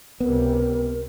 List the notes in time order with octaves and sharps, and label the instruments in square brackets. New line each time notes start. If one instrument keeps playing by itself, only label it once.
[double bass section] C#2 C3 G3 [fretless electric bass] B3 [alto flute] A#4